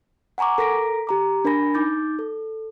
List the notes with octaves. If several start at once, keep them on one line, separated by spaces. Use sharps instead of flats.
F#5 G#5 A#5 C#6 D6
A4 A#4 A#5 A#6 B6 D7
G4 A#5 D6
D4 A#4 G#5 B5 A#6
D#4 D6 G6 A6
A4